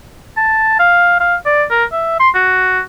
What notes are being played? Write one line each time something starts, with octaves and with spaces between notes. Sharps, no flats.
A5
F5
F5
D5
A#4
E5
C6
F#4